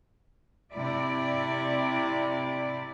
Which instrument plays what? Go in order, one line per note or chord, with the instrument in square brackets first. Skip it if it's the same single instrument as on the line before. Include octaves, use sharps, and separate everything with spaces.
[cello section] C3 E4 D5